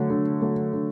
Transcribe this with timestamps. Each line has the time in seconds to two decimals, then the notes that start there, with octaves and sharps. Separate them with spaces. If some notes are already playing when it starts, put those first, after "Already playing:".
Already playing: D3 F#3 A3
0.10 D3
0.41 F#3 A3
0.74 D3